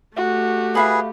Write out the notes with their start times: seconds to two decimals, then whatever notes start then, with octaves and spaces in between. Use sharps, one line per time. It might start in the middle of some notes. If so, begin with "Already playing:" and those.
0.16 A3 F#4 G4
0.75 G#4 B4 E5 F5 B5